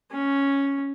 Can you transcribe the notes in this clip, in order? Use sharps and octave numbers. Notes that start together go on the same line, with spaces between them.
C#4